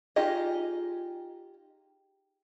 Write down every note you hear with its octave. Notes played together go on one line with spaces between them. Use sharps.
D#4 F4 G4 G#4 D#5